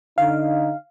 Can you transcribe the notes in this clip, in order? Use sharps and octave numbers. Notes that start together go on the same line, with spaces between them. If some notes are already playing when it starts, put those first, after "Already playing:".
D3 D#4 F5